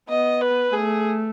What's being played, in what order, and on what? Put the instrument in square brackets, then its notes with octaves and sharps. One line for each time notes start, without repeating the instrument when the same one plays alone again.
[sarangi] B3 [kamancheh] D#5
[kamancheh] B4
[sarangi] A3 [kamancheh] G#4